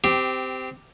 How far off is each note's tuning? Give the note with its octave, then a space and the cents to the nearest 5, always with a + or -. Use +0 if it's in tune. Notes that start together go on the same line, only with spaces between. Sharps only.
C4 -20 G4 +0